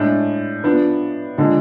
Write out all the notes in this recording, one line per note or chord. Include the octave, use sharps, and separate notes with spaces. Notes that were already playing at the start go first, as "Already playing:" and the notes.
Already playing: A2 G#3 D4
F3 B3 D4
D3 F3 G#3 D4